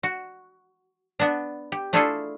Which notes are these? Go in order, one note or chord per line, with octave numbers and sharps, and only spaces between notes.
F#4
B3 D4
G4
A3 D4 E4 F4 G#4 A4